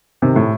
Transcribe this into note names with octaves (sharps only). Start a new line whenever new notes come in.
C3 D#3
A2